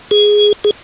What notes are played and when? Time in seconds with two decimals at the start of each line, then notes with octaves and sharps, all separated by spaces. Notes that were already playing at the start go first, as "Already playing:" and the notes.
0.11 G#4
0.64 G#4